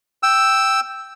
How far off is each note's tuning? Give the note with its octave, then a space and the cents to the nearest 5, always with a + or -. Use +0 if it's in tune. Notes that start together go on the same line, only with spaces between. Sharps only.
G5 +0 E6 +0